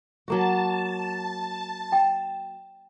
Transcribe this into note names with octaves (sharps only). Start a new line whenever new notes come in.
F#3 A#3 F#4 A5
G5